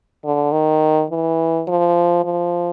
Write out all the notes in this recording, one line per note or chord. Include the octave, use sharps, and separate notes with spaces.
D3
D#3
E3
F3
F3